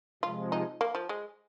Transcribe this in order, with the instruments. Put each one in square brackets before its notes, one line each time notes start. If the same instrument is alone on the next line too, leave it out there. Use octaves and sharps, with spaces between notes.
[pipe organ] C3 F3 G#3 [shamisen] F4
[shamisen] D#4
A#3
F3
G#3